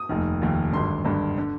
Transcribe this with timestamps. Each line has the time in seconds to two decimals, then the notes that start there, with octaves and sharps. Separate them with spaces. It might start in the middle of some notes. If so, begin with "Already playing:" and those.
Already playing: D#6
0.09 F1 D#2 D#3
0.41 F1 D#2 D#3
0.73 G#1 G2 D3 C6
1.05 G#1 G2 D3
1.38 D3